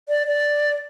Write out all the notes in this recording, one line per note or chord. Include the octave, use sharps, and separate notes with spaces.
D5
D5